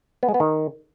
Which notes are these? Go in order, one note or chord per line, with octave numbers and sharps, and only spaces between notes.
B3
G#3
B3
D#3